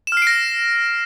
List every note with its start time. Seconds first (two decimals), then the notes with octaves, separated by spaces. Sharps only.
0.07 E7
0.12 F6
0.17 C7
0.22 D7
0.27 A#6